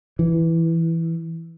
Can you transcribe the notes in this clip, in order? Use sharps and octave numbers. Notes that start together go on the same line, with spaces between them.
E3